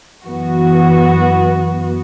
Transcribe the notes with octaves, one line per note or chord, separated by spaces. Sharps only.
F#2 E3 B3 F#4